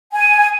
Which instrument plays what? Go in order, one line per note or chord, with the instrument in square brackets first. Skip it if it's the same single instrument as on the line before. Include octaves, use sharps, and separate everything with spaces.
[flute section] G#5